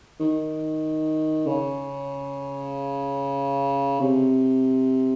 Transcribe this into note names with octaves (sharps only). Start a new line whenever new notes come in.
D#3
C#3
C3